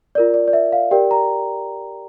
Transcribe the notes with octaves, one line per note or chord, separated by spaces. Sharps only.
F4 A#4 D5
D5
D5
E5
F5
G4 A#4 D5 G5
A#5